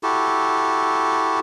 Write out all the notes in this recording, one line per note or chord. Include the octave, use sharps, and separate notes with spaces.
E4 F#4 G4 A4